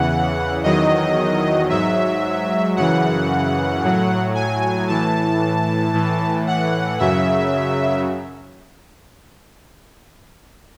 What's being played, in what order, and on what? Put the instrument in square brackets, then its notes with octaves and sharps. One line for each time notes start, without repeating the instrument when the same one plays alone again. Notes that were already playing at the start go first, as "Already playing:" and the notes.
Already playing: [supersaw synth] E2 C#3 E3 F#5
E2 D#3 F#3 D#5
G#2 F#3 E5
F#2 C#3 E3 F#5
A2 F#3
G#5
A2 E3 A5
A2 E3
F#5
F#2 C#3 F#3 E5